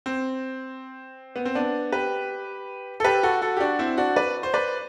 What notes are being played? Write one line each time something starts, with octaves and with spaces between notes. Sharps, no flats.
C4
B3
C4
B3 D4
G4 B4
A4
G4 B4
F#4 A4
F#4 A4
G4
D4 F#4
C4 E4
D4 F#4
B4 D5
C5
B4 D5